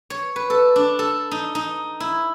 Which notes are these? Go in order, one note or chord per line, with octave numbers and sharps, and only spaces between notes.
C#5
B4
A4
D4
A4
D#4
D#4
E4